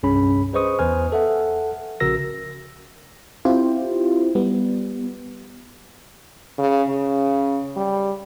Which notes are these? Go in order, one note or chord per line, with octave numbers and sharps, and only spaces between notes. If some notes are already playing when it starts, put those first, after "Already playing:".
C2 G2 C#4 G#4 B5
G#4 B4 C5 D#5 C#6 D#6
E2 B4 C5 G#5 F6
A4 E5 F#5
A#1 C#3 F#4 A#4 E6 A#6
C4 E4 F4 G4 C5
G3 B3
C#3
C#3
G3